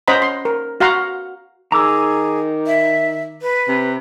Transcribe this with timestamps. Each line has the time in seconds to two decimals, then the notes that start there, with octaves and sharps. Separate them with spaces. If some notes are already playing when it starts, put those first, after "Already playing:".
0.08 C#4 C5 D#5 F#5 A#5 B5
0.22 C6
0.45 A#4
0.80 F#4 F5 F#5 A#5 C6
1.72 D#3 G#4 A#5 D6 E6
2.66 E5
3.41 B4
3.68 C3